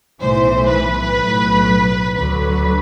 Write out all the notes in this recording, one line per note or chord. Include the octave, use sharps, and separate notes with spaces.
B1 A2 E3 C5
B4
B1 A2 F#3
D2 D3 F#3 B4